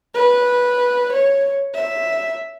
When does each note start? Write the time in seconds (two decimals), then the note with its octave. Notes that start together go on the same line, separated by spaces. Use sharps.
0.14 B4
1.13 C#5
1.74 E5